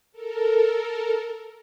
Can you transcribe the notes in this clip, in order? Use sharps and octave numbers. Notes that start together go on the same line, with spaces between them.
A4 A#4